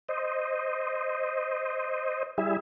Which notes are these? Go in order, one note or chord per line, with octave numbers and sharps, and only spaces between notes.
C5 D#5
G3 E4 G#4 E5